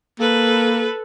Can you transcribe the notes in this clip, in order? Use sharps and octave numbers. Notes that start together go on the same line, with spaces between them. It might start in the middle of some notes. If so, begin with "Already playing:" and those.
A#3 A4 B4